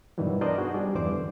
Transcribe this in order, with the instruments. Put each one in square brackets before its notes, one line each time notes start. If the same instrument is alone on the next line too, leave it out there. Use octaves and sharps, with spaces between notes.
[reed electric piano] G2 B2 D#3 E3 F#3 G3
B3 D4 A#4 C5 D5 D#5
D#4 F#4 G#4
G3 D4 G#4
E2 G2 E3 C5 D5 D6
D3